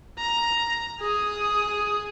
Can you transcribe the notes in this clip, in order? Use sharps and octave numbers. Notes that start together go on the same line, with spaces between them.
A#5
G#4 D#6